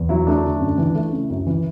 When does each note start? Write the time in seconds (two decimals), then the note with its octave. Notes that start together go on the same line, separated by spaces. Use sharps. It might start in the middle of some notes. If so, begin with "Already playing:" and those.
Already playing: E2
0.09 F#3 E4
0.27 A3 D4
0.43 D3
0.60 F#2
0.78 E3
0.95 A3 E4
1.12 C#3
1.30 F#2
1.47 E3